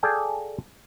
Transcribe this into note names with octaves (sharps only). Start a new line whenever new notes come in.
G#4 A4 D5 F5 G5 G#5